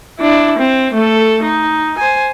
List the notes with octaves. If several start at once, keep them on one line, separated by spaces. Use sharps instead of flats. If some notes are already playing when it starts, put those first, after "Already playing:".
D4 E4
C4
A3 A4
D#4
C5 G#5